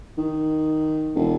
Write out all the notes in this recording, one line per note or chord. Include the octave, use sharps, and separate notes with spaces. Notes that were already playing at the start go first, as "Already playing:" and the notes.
D#3
E1